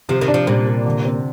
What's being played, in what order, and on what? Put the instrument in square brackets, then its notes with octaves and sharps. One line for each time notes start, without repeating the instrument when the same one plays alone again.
[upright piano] C3 [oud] F3
[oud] D#3
[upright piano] D4
[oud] F3
[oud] A#2 [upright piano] G3
[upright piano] C3
D3
C4